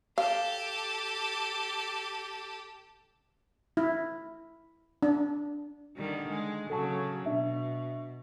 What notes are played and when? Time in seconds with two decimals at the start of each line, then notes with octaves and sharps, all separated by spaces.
0.18 G4 A4 F5
3.77 E4
5.02 D4
5.97 D3 D#3 G3
6.30 G#3
6.70 C#3 F#3 A4 F#5 A5
7.26 B2 D4 E5